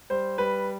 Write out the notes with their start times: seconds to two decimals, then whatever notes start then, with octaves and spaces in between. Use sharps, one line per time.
0.10 G3 C5
0.38 G3 B4